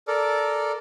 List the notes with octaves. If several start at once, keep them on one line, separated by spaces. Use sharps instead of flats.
A4 A#4 D5